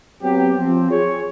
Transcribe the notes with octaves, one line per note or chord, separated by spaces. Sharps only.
F#3 B3 C4 G4
F3 C4
G#4 C#5